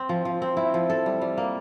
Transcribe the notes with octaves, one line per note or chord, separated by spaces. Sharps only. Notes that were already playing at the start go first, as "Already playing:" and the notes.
Already playing: C4
F3
F3
C4
E4
F3
A4
G3
G3
A#3